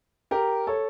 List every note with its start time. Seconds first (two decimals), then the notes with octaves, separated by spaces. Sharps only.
0.31 G4 A#4
0.67 A4 C#5